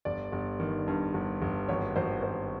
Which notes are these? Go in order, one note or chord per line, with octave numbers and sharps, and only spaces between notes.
G1 D5
G1
D#3
G2
G1
G1
G#1 C#5
G#1 C5
G#1 C5